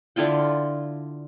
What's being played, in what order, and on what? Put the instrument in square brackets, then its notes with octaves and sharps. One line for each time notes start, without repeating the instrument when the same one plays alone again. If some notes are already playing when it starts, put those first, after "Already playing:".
[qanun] D3 E4 F4 G5